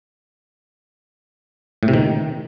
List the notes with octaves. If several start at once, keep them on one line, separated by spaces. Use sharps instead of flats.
A2
C3
D#3